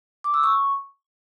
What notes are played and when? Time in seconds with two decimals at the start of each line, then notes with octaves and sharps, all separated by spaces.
0.24 D6
0.34 E6
0.44 C#6